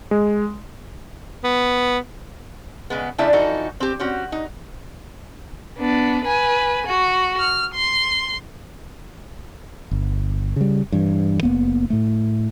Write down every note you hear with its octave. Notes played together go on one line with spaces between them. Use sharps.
G#3
B3
C#3 G#3 B3
C#3 A3 D4 E4 D5 E5
E3 F3 D#4 F#4 A4
C4 G4
C4 C#4 F#4
D#4
B3 D4
B4 G#5
F#4
F6
C6
G1
C#3 G3
G2 E3
F#1 D#2 A#3 B3
A2 A3